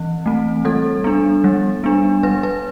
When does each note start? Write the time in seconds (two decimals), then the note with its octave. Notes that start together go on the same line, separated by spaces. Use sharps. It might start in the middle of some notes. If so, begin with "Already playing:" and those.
Already playing: E3 C4
0.26 A3 C4
0.65 G3 A4
1.04 B3 D4
1.44 G3
1.84 B3 D4
2.23 G3 B4
2.43 B4